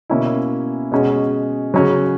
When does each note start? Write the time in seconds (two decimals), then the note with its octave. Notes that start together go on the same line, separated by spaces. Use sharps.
0.10 B2 A#3 C#4 E4
0.92 B2 G#3 C#4 F#4
1.74 C#3 F#3 C#4